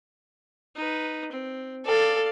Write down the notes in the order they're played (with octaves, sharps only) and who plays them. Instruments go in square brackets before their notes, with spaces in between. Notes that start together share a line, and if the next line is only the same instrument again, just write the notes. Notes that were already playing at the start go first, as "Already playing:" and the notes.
[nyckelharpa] D#4 B4
C4
[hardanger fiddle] A4 [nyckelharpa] D5 F5